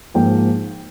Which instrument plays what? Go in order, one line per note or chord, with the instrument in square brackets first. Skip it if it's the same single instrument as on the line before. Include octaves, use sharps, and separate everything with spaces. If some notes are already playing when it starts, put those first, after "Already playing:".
[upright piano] G#2 F3 A#3 G5